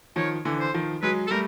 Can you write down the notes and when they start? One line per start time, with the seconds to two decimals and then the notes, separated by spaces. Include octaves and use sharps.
0.16 D#3 F3 C#5
0.45 D3 E3
0.59 C5
0.74 D#3 F3
1.02 F#3 G#3 B4
1.27 A4
1.31 G3 A3 A#4